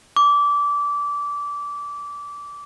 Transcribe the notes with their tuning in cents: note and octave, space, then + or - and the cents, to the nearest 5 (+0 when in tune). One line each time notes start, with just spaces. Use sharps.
D6 -20